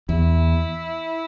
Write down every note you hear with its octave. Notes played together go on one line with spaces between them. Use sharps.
E2 E4